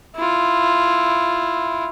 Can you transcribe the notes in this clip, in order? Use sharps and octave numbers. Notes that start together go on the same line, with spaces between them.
E4 F4